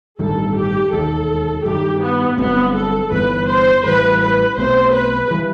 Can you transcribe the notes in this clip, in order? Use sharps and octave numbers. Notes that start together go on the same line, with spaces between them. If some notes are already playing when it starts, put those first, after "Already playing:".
A1 G2 D#3 G3 A4
G4
E1 D#2 D#3 A4
G2 D#3 G3 G4
B3
G1 G2 F#3 B3 C4
A4
G1 G2 E3 B3 B4
C5
A1 A2 E3 G3 B4
B4
B1 B2 A3 C4 C5
B4
E3 G3